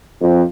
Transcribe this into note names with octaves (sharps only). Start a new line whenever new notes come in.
F2